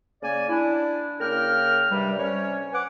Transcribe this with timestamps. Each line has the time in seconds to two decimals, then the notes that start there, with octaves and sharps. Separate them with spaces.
0.22 C#3 A#3 D5 G#5
0.50 D4 E4
1.20 C#3 A#3 A#4 G5 F6
1.91 G2 C3 G3
2.18 C2 C#4 C#5
2.73 B4 F#5 G#5 D6